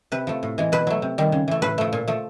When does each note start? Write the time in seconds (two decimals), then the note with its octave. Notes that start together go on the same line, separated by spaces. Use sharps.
0.12 C3 B4
0.27 F3 A3
0.43 A2
0.58 E3 G#3
0.72 B2 B4
0.87 F#3 A3
1.02 C3
1.18 D#3 G3
1.32 C#3
1.48 E3 A3
1.62 A2 B4
1.78 F3 A3
1.93 A#2
2.08 F3 A3